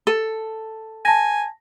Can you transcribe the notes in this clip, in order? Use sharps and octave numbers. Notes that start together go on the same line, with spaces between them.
A4
G#5 A5 A#6